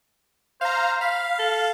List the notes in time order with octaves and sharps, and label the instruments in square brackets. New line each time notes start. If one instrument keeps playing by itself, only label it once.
[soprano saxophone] C5 [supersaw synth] F5 A#5
[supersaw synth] F5 [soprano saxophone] B5
[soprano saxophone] A4